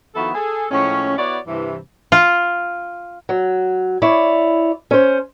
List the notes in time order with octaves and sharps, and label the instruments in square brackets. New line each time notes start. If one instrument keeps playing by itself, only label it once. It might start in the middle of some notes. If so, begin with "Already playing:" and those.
[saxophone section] D#3 F3 B3 E4 F#4 A4
G#4 A4
A2 F3 G#3 C#4
B3 E4 F#4 C#5 D5
G2 C3 E3
[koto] F4
[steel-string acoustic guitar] F#3
E4 C#5 D5
C#4 C5